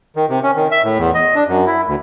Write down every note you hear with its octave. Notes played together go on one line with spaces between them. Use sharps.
D#3
C3
C#4
D#3
E5
A2
E2
D#5
D4
F#2
E4
D2